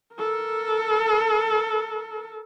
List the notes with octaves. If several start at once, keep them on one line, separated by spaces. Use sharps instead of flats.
A4 A#4